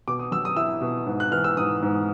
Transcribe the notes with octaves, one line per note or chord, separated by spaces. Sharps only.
B2 D6
D#6
F#3 E6
D#6
E4 E6
B2
G#2
F#6
E3 F6
E6
G#2 D#6
G#2